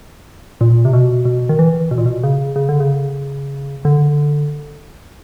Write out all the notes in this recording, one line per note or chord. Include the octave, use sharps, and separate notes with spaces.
A#2
C3
B2
B2
D#3
E3
B2
A#2
B2
C#3
C#3
D3
C#3
D3